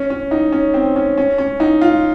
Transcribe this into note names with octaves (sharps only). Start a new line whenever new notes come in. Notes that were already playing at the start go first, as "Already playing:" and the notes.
Already playing: C#4
C#4
D#4
C#4
C4
C#4
C#4
C#4
D#4
F4